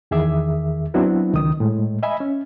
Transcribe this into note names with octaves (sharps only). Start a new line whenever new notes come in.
E2 D#3 G#4 E5 D6
F#3 B3 C4 D4 E4 F#4
C#2 D#3 D#6
A2 G#3
D#5 E5 G#5 B5
C#4